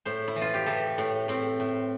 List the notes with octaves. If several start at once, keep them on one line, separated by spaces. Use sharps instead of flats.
A2 C5
E4
E3
F4
G4
E3 A4
A2
A2 C4
A2